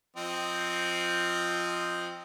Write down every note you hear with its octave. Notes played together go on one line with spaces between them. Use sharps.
F3 C4 D#5